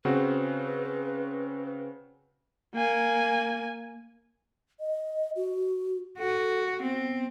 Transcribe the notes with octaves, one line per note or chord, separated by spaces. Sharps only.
C#3 C4 F#4 B4
A#3 G#5
D#5
F#4
F#4 A4
B3 C4